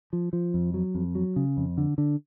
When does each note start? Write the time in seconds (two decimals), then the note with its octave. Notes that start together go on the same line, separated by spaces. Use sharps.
0.13 F3
0.33 F3
0.54 F2
0.74 F#3
0.95 F2
1.15 F#3
1.36 C#3
1.57 F2
1.78 D3
1.98 D3